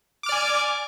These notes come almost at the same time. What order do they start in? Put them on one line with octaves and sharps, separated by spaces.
D6 F6 D5 G#5